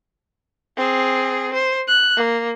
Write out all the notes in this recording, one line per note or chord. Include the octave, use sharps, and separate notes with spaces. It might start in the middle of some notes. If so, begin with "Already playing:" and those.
C4 G#4
C5
F#6
A#3